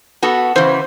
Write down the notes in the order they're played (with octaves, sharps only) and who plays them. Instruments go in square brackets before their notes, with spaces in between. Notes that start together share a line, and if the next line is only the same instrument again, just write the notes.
[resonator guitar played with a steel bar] B3 F#4 A4
[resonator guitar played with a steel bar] C#3 E3 [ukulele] C5